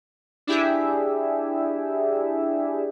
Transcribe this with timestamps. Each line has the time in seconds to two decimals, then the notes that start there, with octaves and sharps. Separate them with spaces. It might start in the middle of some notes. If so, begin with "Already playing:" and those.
0.47 D4 E4 G4 G#4 E5